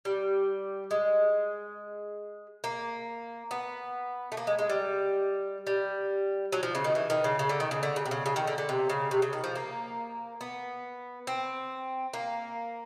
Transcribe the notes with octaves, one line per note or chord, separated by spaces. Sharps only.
G3
G#3
A#3
B3
A3
A#3
G#3
G#3
G3
G3
F#3
F3
C#3
D#3
E3
D#3
C#3
C#3
D3
D#3
C#3
D3
C#3
C3
C#3
C#3
D#3
D3
D3
C3
C#3
C3
C#3
D#3
F3
A#3
B3
C4
A#3